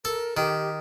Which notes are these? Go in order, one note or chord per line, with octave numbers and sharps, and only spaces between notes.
A4 A#4
D#3 G4